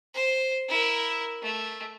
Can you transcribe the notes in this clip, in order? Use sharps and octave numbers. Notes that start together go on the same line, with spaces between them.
C5
E4 A#4
A3